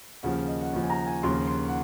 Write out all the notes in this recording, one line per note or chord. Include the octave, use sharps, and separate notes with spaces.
D#2 C#3 F3 F#5
D#5
F#5
D#2 C#3 F3
G#5
A#5
G#5
D#2 C#3 F3 C6
C6
F#5